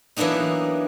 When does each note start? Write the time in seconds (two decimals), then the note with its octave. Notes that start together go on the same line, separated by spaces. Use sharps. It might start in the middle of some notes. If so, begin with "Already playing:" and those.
0.17 E3 F#3 A#3 B3 D4 D#4